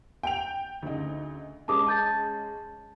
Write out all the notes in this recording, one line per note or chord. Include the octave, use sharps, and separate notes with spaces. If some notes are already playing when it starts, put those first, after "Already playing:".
G5 D7 F7
D2 C#3 D#4
G#3 C#4 A5 D6 D#6
A5 G6 A6